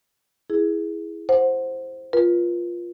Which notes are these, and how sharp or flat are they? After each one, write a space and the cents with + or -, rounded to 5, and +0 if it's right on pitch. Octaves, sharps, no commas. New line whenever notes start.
E4 +0 G#4 +0
C5 +5 F#5 -10
F4 +0 B4 -40